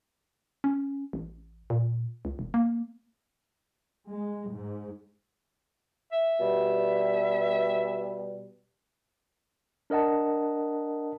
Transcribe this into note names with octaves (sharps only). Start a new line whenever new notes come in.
C#4
A1
A#2
C#2
E1
A#3
G#3
G#2
E5
B2 G3
D4 A#4 D#5 F#5 A5